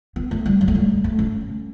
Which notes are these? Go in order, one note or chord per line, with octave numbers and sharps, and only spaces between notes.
B3
A3
G3
F#3
A3
G3
A3
C#4